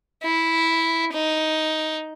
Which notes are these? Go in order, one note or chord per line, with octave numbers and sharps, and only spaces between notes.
E4
D#4